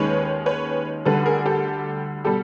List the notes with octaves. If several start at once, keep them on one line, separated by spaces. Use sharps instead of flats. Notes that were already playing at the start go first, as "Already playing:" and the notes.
Already playing: D#2 D#3 G#3 C#4 B4 C#5
B4 C#5
D2 D3 G3 A4 B4
G#4 A#4
G4 A4
B2 G3 G4 A4